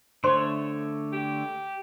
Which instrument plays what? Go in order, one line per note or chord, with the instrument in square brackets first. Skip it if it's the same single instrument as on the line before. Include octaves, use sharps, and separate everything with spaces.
[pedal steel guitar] D3 A3 C#5 [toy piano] C5 C6
[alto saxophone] G4